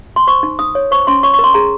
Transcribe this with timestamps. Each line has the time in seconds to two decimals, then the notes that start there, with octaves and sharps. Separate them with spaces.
0.16 C6
0.27 C5 C#6
0.43 D#4
0.59 D#4 D#6
0.75 C#5
0.91 C5 C#6
1.07 C#4 C6
1.23 C#5 C#6
1.34 C#6
1.39 A#4
1.44 C6
1.54 G#4 A#5